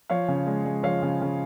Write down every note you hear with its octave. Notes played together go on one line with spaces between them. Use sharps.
F3 C#5 F5
C#3
G#3
G#3
F3 C#5 F5
C#3
C#3